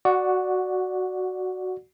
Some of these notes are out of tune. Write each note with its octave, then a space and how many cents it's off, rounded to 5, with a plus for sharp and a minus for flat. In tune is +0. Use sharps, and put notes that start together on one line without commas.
F#4 +0 D5 +5 F#5 -20